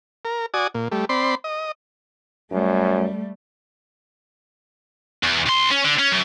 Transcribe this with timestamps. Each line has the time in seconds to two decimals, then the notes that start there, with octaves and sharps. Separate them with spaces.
0.25 A#4
0.54 F#4 D5 G#5 D#6
0.74 A#2
0.92 G3 A3
1.09 C4 D5 B5 C6
1.44 D#5
2.52 F#2 G3 A3
5.23 E2
5.46 C2 C6
5.71 C#4
5.84 D3
5.99 C#4
6.11 F#2